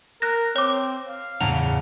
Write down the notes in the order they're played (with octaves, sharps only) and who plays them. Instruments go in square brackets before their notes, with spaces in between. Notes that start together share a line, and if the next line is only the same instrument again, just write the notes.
[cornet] A#4 [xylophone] F#6 A#6
[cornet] C4 [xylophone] C#5 D6
[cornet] F5
[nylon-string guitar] E2 A2 C#3 [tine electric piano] F#5 A5 A#5 [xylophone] F7